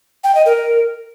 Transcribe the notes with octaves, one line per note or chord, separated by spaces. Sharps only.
G5
D#5
A#4